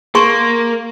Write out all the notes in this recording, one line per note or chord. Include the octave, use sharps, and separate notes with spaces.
A#3 G#4 C6 C#6